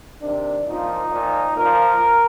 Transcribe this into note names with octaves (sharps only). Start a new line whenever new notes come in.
C3 D#3 D4
A#2 F3 D#4
A#2 F3
A#2 F3 A#4